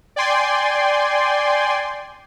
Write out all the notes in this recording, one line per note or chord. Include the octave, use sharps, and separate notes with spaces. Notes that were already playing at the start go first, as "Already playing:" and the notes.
D5 G5 G#5 C6